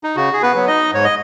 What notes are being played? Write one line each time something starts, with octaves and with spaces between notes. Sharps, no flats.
D#4
C#3 F#4
G#4
B3 B4
F#3 B3
D#4 D#5
G#2 C#5
D#5